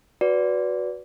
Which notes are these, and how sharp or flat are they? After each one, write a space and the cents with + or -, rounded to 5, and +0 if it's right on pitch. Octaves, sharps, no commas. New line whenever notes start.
F#4 +0 B4 +0 D5 -20